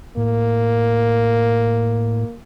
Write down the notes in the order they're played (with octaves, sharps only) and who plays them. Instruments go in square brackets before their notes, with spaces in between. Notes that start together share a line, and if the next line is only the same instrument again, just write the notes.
[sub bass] A2 [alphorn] A#3